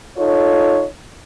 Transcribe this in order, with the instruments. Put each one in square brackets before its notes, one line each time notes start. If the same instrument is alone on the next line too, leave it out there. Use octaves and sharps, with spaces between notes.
[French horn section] D#4 F4 A4 C#5